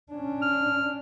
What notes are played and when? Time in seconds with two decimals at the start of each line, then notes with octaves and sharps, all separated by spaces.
0.12 C#4 D4
0.42 F6